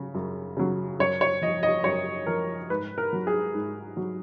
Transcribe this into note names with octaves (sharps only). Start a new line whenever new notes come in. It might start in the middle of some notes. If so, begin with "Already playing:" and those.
Already playing: C#3 F#3
F#2
C#3 F#3
F#2 C#5
C#5
F3 D#5
D#5
F#2 C#5
F3 A#4
G#2 B4
A#4
F#3
G#4
G#2
F#3